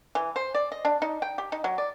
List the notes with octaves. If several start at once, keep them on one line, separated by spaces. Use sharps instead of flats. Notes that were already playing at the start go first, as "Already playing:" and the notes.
E3
C5
D5
D#5
D4
D#4
G5
G4
D#4
F#3
D5